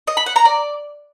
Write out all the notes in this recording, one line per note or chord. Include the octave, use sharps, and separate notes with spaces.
D#5
B5
F#5
A#5
D5